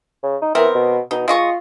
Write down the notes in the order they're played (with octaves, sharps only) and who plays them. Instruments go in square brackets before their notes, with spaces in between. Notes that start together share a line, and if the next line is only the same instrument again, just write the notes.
[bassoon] C#3
D#4
[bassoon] E3 [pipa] B3 C4 A#4
[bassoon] B2
[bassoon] B2 [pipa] D#4
[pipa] G#3 D#5 C#6 [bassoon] F4